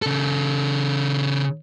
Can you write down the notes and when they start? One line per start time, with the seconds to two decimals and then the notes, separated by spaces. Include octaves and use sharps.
0.02 C#3 A4